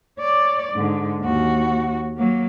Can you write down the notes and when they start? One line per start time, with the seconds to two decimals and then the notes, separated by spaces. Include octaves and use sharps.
0.19 C#5 D5
0.73 G#2 D3
1.21 D#2 F#4
2.17 F#3 A#3